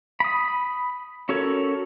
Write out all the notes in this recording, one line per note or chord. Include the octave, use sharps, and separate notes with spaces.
B5 D#6
C#4 F#4 A4 A#4 C#5